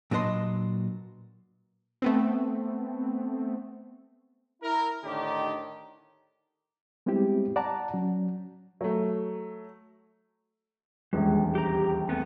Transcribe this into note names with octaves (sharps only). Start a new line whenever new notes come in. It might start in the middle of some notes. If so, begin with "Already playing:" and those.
A#2 F#3 D4 B4 D#5 C6
A3 B3 C4
E4 A#4
A2 D3 D#3 D4 D#4 G4
G3 G#3 B3 C4 E4 G4
D5 F#5 A5 A#5
F#3 C#4
F#3 A3
D#1 A#1 E2 G#3
G4 A#5
A3 B3 C4